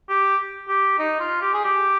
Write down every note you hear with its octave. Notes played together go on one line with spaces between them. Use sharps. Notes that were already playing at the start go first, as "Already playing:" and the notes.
G4
G4
D#4
F4
G4
G#4
G4